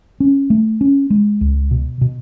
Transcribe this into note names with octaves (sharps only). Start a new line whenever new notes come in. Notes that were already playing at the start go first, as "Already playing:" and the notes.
C#4
A3
C#4
G#3
C#2
B2
B2